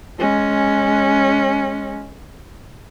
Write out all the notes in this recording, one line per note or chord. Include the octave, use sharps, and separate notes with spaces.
G#3 C#4